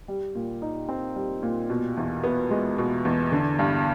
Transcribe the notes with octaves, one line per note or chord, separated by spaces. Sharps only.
G3
A#2
D#4
C4
G3
A#2
B2
E2
B3
G#3
B2
E2
D3
G2